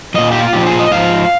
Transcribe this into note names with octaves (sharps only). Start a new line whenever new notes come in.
A#2 F3 D#5
G4
F4
A#2 F3 G4
G#4
D#5
G#2 F3 F5